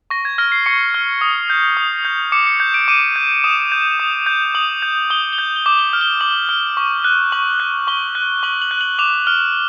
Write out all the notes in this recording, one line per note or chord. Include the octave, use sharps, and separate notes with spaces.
C#6 A#6
G#6
F6 A#6
C7
C#6 C#7
F6
D#6
G6
D#6
G6
D6 C#7
C#7
G6
D7
D6 D#7
G6
D#6 E7
G6
D#6
G6
D#6 F#7
G6
D#6 G7
G7
G6
G7
D6
G7
F6
G7
D6 F#7
F6
C#6
F#6
C#6 F#7
F#6
C#6 G7
F#6
C#6 F#7
F#7
F#6
F#7
D6 F7
F6